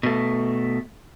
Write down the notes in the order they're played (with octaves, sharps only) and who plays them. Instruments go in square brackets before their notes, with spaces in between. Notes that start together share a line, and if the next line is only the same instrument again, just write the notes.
[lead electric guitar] B2 A3